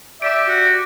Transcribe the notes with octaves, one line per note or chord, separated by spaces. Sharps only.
G4 D5 E5 D6 D7
F#4